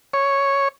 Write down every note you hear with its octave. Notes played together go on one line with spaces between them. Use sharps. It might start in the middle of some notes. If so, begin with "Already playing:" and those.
C#5